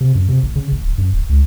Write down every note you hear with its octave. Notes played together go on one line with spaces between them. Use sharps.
C3
F#2
C3
A1
C#3
A1
D1
F#2
D1
C#2